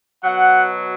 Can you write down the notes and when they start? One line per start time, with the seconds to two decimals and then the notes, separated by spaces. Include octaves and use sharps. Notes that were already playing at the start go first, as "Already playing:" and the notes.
0.24 B2 F#3 F#5